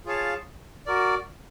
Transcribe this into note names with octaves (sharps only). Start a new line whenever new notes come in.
F4 G#4 C#5 F5 A5
F#4 A#4 D5